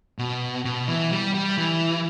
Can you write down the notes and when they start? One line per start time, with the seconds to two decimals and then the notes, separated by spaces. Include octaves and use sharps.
0.19 B2
0.65 B2
0.88 E3
1.11 G3
1.34 G3
1.58 E3